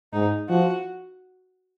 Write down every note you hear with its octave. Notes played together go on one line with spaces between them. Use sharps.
G#2 D#4
F3 F#4